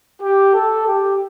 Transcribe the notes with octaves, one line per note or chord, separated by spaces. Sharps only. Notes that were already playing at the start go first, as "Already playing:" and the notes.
G4
A4
G4